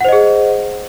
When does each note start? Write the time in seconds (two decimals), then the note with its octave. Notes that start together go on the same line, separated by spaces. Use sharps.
0.01 F#5
0.05 C5
0.09 D#5
0.13 G#4